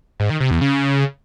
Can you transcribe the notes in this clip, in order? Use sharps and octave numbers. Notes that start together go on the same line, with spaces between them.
G#2
D#3
C3
E2
C#3